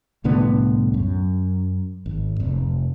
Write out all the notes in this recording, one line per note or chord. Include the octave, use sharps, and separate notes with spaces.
C2 A2 D3 B3
F#2
G#1
F1